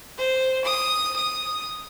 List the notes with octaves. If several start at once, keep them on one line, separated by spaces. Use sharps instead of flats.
C5
D#6
D#6